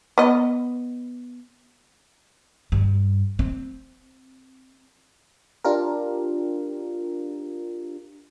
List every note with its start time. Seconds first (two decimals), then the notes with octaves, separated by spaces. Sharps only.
0.18 B3 D#5
2.72 G2
3.39 C4
5.64 D4 F4 G4 A#4